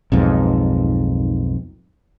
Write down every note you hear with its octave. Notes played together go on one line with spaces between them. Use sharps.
B1 F2 G#2